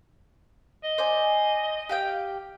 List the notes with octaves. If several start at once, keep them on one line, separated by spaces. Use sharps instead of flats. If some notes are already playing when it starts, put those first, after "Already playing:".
D#5
C5 D5 G#5
G4 F5 G5